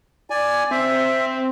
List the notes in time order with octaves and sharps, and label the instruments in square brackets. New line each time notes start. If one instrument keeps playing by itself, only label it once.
[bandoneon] D5 G#5
[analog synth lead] C4 [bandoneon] E5